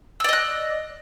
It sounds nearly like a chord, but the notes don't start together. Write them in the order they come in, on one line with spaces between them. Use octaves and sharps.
E6 D5 D#5 F#6